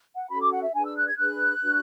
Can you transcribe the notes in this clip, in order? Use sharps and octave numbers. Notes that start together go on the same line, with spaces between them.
F#5
C#4 F#4 A4 C#5 B5
D6
F#5
E5
D4 G#4 B4 G#5
E6
F#6
G#6
D4 G#4 B4 F#6
D4 F#4 B4